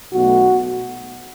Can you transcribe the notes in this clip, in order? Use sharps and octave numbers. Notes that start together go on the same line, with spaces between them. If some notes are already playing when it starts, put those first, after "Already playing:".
B1 B2 A3 F#4